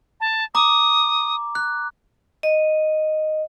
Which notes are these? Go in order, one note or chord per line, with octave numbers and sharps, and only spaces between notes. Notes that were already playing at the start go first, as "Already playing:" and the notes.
A5
A#5 D6 D#6
F#6
D#5